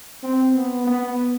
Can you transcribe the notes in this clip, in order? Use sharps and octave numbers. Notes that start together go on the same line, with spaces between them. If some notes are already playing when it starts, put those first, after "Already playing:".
C4
B3
B3